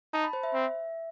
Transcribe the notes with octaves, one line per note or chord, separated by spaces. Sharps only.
D#4 A5
B5
C5
E5
C4